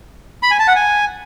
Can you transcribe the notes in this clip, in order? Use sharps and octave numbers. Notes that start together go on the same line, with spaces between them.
B5
G#5
A5
F#5
G#5